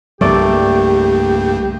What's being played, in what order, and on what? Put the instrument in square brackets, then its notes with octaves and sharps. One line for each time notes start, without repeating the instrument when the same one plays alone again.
[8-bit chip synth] C2 G2 C#3 [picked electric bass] G3 A#3 [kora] A3 D5 [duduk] G4